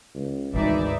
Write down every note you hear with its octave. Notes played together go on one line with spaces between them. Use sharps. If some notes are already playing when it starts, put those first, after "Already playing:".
C#2
G#1 D2 G#2 E3 D#4 D5 E5